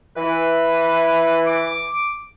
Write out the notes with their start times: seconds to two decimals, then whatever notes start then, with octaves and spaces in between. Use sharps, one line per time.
0.16 E3 B4
1.46 D6